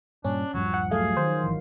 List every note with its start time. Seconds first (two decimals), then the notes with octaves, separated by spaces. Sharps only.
0.25 G2 A#2 C#4 D4
0.54 D#1 G2 F3 F#3
0.74 F#5
0.91 F#3 A3 G#4 F5
1.17 D#3 C5
1.44 G#1 E3